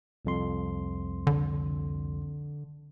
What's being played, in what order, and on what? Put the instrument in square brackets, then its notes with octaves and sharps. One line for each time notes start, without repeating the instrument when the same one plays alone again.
[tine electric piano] C2 F2 C6
[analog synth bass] D3